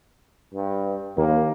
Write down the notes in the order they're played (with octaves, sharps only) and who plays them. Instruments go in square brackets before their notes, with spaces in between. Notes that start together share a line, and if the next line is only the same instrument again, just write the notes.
[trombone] G2
[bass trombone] D#2 [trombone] A#3